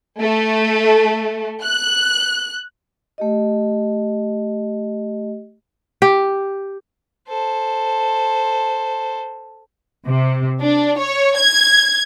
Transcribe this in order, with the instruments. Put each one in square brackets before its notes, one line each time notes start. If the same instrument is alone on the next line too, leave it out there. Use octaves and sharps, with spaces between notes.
[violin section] A3
F#6
[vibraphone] A3 G4 D#5
[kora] G4
[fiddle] A4 C5
[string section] C3
D4
C#5
G#6